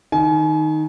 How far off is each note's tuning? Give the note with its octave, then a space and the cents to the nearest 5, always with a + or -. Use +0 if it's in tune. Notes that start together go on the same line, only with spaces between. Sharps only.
D#3 +0 G#5 +35